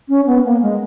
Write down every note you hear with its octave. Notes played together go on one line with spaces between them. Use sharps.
C#4
B3
A#3
G#3